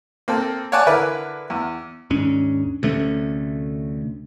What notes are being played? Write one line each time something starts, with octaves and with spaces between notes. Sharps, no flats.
A#3 C4 A4
C#5 D5 F#5 G#5 A5 D6
D3 E4 A#4 B4
E2
D#2 G#2 C#4 D4
D2 C3 A3 C#4